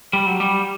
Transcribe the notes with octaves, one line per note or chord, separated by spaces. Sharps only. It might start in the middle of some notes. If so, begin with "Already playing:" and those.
G3
F#3
G3